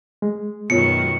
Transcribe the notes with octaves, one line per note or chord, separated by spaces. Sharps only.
G#3
F#2 B2 D#3 B3 F4 C#5 C#7